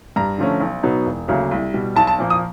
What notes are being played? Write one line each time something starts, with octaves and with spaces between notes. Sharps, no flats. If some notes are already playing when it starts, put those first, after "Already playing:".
G2 A#5
D3 F3 A3 C#4
B1
B2 F#3 B3 D#4
E1
D2 C#3 F#3 A#3
C2
B2 G3
B1 A5
A5
A#2 F3 A#3
D#6